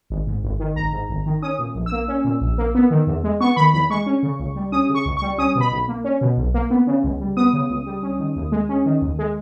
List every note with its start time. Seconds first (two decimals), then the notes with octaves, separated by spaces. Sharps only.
0.10 G#1
0.27 G#2
0.43 G#1
0.59 D#3
0.76 G#1 A#5
0.92 G#2
1.09 G#1
1.26 D#3
1.42 C#4 D#6
1.59 A#2
1.75 A#1
1.86 E6
1.92 A#3
2.08 C#4
2.25 A#2
2.41 A#1
2.58 A#3
2.75 B3
2.91 D#3
3.07 E2
3.24 G#3
3.40 B3 C#6
3.56 D#3 B5
3.73 E2 B5
3.90 G#3 C#6
4.06 C#4
4.23 C#3
4.39 C#2
4.56 G3
4.72 C#4 D#6
4.89 C#3
4.95 C#6
5.06 C#2
5.17 G3 C#6
5.38 C#4 D#6
5.55 B2
5.61 B5
5.72 B1
5.88 A#3
6.04 C#4
6.21 B2
6.37 B1
6.54 A#3
6.71 B3
6.87 C#3
7.04 C#2
7.20 G3
7.37 B3 D#6
7.53 C#3
7.70 C#2
7.86 G3
8.03 C#4
8.19 D#3
8.36 D#2
8.52 G#3
8.69 C#4
8.86 D#3
9.02 D#2
9.19 G#3